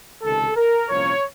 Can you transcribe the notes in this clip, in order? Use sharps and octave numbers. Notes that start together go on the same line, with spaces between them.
C#2 C3 D#3 A4
A#4
C2 A#2 F3 A#3 C#4 C#5